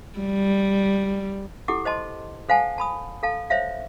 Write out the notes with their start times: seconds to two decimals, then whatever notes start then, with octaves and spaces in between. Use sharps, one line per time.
0.19 G3
1.68 E4 G4 A4 F#5 D6
1.85 C5 D#5 A5 C6
2.49 A4 C5 F5 F#5 G#5 A5
2.78 A5 B5 D#6
3.23 A4 F5 A5
3.50 C5 C#5 E5 F5